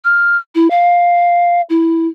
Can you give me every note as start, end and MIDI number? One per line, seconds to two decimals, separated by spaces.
0.05 0.37 89
0.55 0.68 64
0.70 1.61 77
1.69 2.07 64